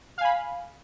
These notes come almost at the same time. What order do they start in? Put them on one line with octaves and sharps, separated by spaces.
F5 G#5 B5